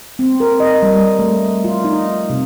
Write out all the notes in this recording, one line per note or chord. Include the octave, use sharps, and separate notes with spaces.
C4
A#4
D#5
G3
A3
F4
D#4
C3